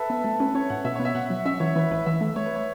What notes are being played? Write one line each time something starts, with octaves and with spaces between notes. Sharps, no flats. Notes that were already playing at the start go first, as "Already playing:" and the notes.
Already playing: A4 B4 E5
B3
A3 A4
C#4 B4
C#4 C#5
A2 F#5
B2 E5
B3 C#5
E5
B2 F#5
F#3
C#4 E5
E3 C#5
E3 B4
A1 B4
E3 E5
A3
A3 C#5
B4
C#5